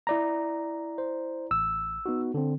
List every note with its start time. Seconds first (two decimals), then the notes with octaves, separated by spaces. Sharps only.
0.07 E4 D5 A#5
0.98 C5
1.51 A1 E6
2.06 B3 D#4 F#4
2.34 D3 C4